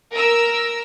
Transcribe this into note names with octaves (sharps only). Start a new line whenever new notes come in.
A#4 E6